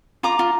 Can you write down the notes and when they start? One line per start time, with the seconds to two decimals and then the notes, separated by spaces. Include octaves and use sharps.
0.23 F4 A#5 D6
0.39 F4